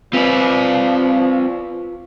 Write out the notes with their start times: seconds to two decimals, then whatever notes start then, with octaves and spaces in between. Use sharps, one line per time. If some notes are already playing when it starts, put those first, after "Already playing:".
0.13 F3 C4 F4 B4 D5